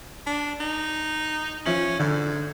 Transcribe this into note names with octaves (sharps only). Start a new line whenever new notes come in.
D4
D#4
F3 C#4 E5 F#7
G#2 D3